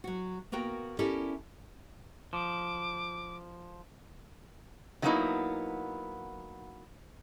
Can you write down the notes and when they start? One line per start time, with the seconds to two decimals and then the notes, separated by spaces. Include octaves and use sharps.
0.04 F#3 F#4
0.52 A#3 B3 F#4 A#4 G5
0.99 C#4 E4 G4 A4 A#4 D5
2.33 F3 D6
5.02 D#3 F#3 A#3 B3 D#4 E4